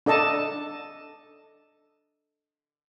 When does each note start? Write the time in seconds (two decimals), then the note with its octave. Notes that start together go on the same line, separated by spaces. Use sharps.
0.06 D4 A4 D#5 A5